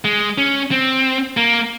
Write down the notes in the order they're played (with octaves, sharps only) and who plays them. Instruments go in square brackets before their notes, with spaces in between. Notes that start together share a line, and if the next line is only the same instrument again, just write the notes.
[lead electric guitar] G#3
C#4
C4
A#3